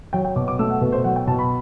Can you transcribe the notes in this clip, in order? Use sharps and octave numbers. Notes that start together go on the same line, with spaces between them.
F#3 G5
G5
B2 D6
D6
A3 E6
F#5
B2 B4
C5
F#3 F#5
G5
B2 A5
B5